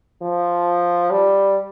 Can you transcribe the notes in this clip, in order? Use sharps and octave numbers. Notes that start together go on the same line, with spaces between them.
F3
G3